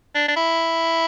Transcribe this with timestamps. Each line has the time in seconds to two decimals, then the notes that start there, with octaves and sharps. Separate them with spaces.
0.15 D4
0.28 D4
0.36 E4